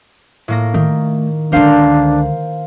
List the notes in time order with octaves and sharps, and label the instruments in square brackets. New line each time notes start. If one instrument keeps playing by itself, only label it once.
[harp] A2 A#3 A#6
[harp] D#3 [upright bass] A3
[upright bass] C#2 D3 [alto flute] D4 [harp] A#4 C5 F5